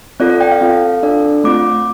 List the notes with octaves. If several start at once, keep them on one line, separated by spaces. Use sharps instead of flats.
C4 F4 A4 D5
D5
G5
F5
C4 F4 A4
D4 A4 D5
A3 C4 F4 D6